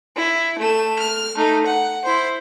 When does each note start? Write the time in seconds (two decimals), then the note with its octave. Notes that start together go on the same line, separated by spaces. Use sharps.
0.16 E4
0.58 A3 E7
0.99 F6
1.36 A3 D#4
1.66 F#5
2.04 E4 C5